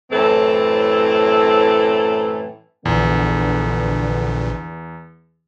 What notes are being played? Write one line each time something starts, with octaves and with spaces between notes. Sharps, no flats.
F#2 A2 E3 C4 A4
A#1 E2 A#2 D3 B3 D4